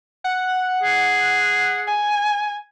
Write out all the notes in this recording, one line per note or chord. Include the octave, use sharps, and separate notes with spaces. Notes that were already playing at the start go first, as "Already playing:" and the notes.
F#5
G#4
G#5